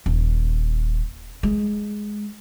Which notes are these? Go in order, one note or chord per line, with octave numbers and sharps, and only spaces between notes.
D#1
G#3